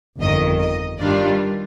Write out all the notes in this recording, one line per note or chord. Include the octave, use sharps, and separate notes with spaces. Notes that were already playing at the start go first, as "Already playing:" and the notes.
G1 F2 D#3 D#5
D#5
G2 D#3 G3 D4 F4 D5